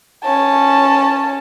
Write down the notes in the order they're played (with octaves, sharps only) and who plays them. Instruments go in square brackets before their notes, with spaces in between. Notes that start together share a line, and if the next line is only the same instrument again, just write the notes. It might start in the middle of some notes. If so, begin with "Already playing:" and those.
[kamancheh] C#4 A5